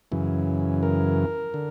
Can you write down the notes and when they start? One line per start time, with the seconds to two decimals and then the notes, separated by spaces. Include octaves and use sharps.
0.12 F#2 C#3 E3
0.83 A#4
1.54 D3